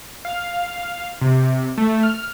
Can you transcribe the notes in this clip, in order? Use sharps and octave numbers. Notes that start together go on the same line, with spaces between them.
F5
C3
A3
F6